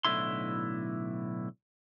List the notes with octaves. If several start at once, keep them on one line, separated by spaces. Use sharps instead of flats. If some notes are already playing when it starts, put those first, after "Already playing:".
B1 A2 D3 E4 C6